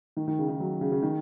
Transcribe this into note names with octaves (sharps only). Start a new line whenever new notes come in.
D#3
D#3
C#3
D#3
F#3
C#3
C#3
D#3